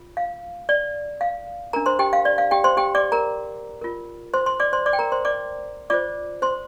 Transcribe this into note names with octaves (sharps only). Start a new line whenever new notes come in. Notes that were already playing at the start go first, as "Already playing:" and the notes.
Already playing: F4
F5
D5
F5
D4 A#4 A#5
C5 C6
G4 G5
F5
D5
F5
G4 G5
C5 C6
G4 G5
D5 D6
A#4 A#5
F4 A#4
C5 C6
C5 C6
D5 D6
C5 C6
D5 D6
G5
A#4 A#5
C5 C6
D5 D6
F4 C5 D5 D6
C5 C6